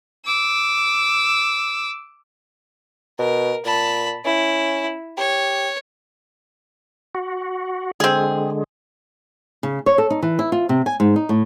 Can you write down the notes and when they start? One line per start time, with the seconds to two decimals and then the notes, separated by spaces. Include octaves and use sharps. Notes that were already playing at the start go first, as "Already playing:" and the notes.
0.25 D6 E6
3.19 B2 A#4
3.65 A#2 A5 B5
4.25 C#4 E4
5.18 G4 C#5
7.15 F#4
8.00 D3 G#3 C4 G#4
9.63 C#3
9.86 C#5
9.98 A4
10.10 D#4
10.22 E3
10.39 E4
10.52 F4
10.69 C3
10.86 G#5
11.00 G#2
11.16 D#4
11.29 A2